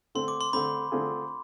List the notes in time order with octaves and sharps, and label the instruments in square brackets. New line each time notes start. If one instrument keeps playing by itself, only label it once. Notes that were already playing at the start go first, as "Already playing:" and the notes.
[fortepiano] D3 A3 C4 [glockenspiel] C6
[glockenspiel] D6
C6
[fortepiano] D3 A3 C4 [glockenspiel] B5
[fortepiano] D3 A3 C4 F4 G#4